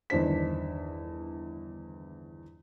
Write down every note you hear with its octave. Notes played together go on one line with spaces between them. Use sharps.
G1 E2 D#3 D4 C5 B6